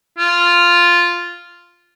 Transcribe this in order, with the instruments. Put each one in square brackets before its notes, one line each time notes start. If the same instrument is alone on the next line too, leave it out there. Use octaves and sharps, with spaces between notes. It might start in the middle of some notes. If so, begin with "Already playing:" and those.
[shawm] F4